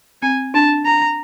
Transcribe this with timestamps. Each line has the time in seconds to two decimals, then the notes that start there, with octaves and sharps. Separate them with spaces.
0.22 C4 G#5
0.54 D4 A5
0.85 A#5